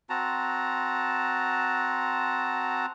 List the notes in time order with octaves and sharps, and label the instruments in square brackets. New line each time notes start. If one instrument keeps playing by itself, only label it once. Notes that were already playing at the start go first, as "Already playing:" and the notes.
[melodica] C4 F#4 A5 A#5